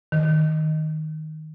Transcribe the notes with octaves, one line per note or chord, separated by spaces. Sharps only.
D#3